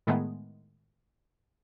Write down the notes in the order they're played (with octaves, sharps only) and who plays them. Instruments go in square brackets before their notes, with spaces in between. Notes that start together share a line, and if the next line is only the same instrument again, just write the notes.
[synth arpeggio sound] A2 D#3 G#3 A3 B3